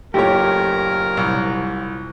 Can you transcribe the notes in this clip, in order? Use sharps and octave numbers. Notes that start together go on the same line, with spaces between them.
F#1 A#2 A3 G4 A#4 C#5
C2